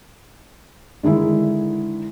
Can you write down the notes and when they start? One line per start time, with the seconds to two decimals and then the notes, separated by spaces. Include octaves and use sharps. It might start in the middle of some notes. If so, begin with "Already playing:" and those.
1.03 D3 D#3 G#3 E4